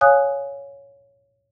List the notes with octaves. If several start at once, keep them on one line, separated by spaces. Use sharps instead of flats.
C#5 F5 G#5 D#6 F#6